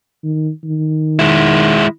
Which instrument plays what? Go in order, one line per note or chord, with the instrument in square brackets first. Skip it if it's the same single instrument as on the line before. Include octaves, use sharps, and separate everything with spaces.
[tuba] D#3
D#3
[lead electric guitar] G#3 E4